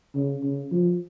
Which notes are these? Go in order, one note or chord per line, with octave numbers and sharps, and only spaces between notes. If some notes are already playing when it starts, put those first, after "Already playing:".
C#3
C#3
F3